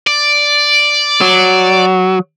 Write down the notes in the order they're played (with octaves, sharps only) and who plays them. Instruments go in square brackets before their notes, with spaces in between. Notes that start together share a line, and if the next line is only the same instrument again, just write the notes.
[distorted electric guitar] D5
[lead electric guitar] F#3